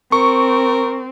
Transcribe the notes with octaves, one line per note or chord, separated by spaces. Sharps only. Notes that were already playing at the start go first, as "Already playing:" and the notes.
C4 A#4 C#6